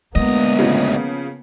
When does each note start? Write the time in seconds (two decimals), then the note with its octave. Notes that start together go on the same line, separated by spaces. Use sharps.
0.15 D2 G#3 A#3 B3 D#5
0.59 C#3 F3